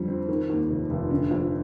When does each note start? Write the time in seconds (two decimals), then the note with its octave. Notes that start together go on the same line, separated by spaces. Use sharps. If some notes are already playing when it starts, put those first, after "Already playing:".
Already playing: F2 D3 G3
0.08 C4
0.29 D#3
0.49 D#2
0.70 F1
0.90 F1
1.11 D3
1.31 F2